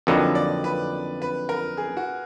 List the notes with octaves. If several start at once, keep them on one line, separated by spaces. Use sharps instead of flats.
F2 D3 F#3 A#3 D#4 B4
D5
B4
B4
A#4
G#4
F#4